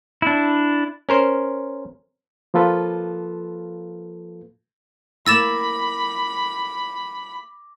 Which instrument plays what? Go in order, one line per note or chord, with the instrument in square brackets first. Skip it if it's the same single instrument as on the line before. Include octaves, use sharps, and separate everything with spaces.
[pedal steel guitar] D4 E4
[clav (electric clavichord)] C#4 A#4 C5
[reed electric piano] F3 A#3 F4 A4 B4
[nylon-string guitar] A#3 E4 [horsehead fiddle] B5 [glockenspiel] D6 A#6 [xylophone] E6 A6 E7